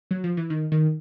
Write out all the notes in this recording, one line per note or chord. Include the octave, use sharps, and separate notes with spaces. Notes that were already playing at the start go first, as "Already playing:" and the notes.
F#3
F3
E3
D#3
D#3